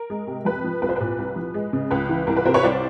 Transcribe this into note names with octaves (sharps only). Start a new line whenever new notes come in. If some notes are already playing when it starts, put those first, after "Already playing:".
Already playing: A#4
G#3
C3
F2 B4
F3
C2 B4
C5
A#2 B4
C2
F3
G#3
C#3
C#2 B4
E3
C2 A#4
B4
C3 A#4 C5
B4 C#5
C2 C5 D5